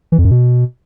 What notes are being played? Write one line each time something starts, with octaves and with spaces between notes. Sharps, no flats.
E3
F2
F#2
B2